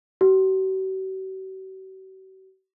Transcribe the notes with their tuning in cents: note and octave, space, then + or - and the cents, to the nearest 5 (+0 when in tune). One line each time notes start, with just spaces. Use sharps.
F#4 +45